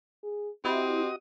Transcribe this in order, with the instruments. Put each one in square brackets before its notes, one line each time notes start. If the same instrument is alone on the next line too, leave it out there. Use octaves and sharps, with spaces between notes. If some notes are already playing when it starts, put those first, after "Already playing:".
[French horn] G#4
[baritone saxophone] C4 [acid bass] E4 [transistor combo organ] F#4 D#5 D#6 [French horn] G4